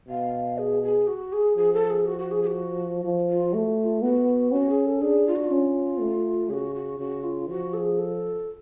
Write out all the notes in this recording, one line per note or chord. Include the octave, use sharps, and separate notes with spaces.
B2 F5
G#4
G#4
F#4
G#4
F3 G#4
A4
G#4
F#4
F#4
G#4
G#4
F#4
F3
F4
A3 F#4
F#4
F4
B3 F#4
C#4 F#4
G#4
A4
D4 G#4
F4
F#4
F4
C#4
A3
C#3 F#4 G#4
F#4
C#3 F#4
F4
F3 F#4
A4
G#4
A4